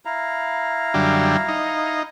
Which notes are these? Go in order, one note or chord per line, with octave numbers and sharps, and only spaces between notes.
E4 F5 A#5
F#2 D3 G3
D#4